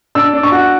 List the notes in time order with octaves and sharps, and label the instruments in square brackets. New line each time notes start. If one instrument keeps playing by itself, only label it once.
[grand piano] D4 [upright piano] E6
[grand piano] D4
[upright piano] C#6
[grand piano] F#4